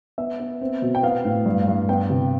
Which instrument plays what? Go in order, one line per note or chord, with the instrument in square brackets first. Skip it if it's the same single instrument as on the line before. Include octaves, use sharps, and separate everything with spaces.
[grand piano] B3 E5
B3
C4
B2
G5
B3 F5
A2
G2
G2
B3 G5
C3